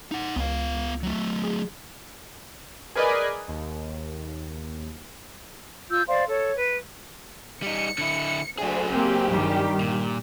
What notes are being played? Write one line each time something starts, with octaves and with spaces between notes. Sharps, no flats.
D#4 F#5
C#2 B3 F5
F#3 A3
G#4
G#4 A#4 B4 D5 D#5 G#5
D#2
F4 E6 G6
C5 D5 F5 C6
A4 C#5
B4
G3 D#4 C#7
D3 E4
D2 F#3 G#4
A#3 C4 G4
G2 D#3 G3
A#2